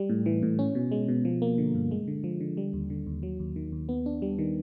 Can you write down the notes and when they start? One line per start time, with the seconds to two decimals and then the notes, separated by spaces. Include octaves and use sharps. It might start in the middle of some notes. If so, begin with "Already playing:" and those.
Already playing: G3
0.09 A2
0.26 E3
0.43 A2
0.59 C#4
0.75 B2
0.91 G#3
1.08 B2
1.25 F3
1.42 A#3
1.58 D3
1.75 G2
1.91 G#3
2.08 D3
2.24 F3
2.40 D3
2.57 G3
2.74 D#2
2.90 D3
3.07 D#2
3.23 F#3
3.40 D#2
3.56 D#3
3.72 D#2
3.89 B3
4.06 D4
4.22 G3
4.39 D#3